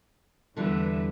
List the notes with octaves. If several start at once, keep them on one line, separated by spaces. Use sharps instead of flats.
E2 D3 E3 G3 B4 E5